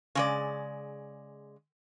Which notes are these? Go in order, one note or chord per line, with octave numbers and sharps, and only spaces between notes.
C#3 G#3 D5